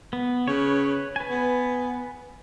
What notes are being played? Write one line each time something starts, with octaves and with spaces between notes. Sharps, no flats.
B3
C#3 B4 C#5
B4 G#5
B3